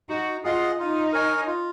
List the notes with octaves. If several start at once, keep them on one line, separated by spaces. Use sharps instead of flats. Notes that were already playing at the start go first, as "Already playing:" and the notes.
D#4 F#4
F4 G#4 D#5 F#5
D#4 F4
A#4 C#5 G#5
F4